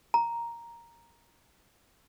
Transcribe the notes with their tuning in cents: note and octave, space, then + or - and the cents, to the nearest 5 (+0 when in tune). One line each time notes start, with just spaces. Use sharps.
A#5 +5